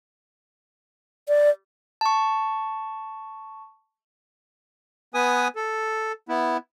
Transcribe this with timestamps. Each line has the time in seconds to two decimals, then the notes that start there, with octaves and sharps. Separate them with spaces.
1.28 D5
2.01 A5 C#6
5.14 B3 B4 G#5 D#6
5.56 A4
6.29 B3 E4